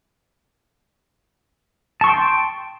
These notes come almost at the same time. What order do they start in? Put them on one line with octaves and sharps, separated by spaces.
A5 C#6 C6 G5